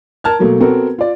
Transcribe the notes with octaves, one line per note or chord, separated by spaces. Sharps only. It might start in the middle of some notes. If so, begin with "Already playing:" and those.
A#4 A5 F6 G#6
B2 F#3 A3 A#3
B3 C4 F#4 A4 A#4
F4 D5